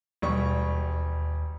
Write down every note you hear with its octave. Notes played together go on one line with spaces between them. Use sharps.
E1 D#2 G3 C#6